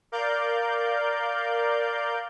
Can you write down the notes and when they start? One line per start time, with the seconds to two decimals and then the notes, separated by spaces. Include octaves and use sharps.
0.12 A#4 D5 F5 G6